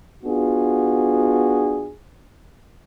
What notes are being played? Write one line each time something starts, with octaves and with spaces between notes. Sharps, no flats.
B3 D4 F4 F#4 G#4